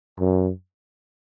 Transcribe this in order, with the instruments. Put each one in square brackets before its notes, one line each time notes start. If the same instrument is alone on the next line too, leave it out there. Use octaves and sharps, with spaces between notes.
[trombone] F#2